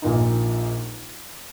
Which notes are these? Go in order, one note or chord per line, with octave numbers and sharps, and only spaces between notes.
A#1 A#2 A#3 D#4